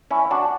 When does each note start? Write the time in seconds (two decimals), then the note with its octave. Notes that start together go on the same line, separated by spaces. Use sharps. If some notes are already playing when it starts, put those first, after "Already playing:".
0.11 C#4 E4
0.31 D4 F#4